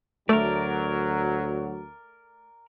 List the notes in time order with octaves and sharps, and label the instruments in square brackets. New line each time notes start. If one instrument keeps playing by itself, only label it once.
[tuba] D2 [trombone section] F#3 [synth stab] A3 [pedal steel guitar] A#4 D5